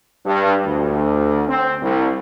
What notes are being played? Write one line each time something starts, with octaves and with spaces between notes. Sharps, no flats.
G2
D2
C4
C2